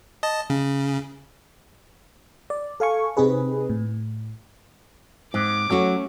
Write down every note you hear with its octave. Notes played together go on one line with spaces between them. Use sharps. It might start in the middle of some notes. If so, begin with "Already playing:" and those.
D#5 A5
C#3
D5
A4 F5 G#5 C#6
C3 C4 D#4 G#4 B4
A2
G#2 C4 D6
F#3 A3 C#4 F#4